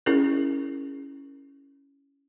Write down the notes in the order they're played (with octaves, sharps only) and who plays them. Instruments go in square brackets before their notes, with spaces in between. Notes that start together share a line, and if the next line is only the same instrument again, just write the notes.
[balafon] C#4 E4 G#4 A#4